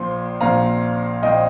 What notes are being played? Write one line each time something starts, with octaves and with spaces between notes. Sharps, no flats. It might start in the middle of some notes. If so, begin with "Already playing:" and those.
Already playing: A#1 A#2 F3 C6
A#1 A#2 F3 F5 A#5
A#1 A#2 F3 D#5 G5